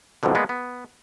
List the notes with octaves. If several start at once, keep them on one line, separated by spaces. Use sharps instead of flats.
C2 F2 G#2 B2 D3
G#3 A#3 B3 D5
B3